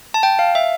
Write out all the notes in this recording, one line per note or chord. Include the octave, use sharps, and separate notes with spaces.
A5
G5
F5
E5